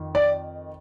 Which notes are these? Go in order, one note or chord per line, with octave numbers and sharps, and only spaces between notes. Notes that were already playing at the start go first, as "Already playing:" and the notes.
Already playing: F2 D#3
D5